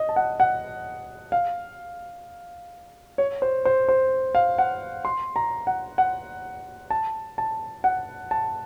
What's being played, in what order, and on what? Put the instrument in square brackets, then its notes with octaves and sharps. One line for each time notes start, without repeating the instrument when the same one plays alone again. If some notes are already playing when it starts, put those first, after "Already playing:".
Already playing: [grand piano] D#5
A5
F#5
F#5
F5
C#5
C5
C5
C5
F5
F#5
C6
A#5
F#5
F#5
A5
A5
F#5
A5